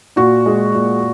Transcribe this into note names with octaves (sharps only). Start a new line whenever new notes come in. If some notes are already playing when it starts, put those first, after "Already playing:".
A#2 F#4
G#3
A#2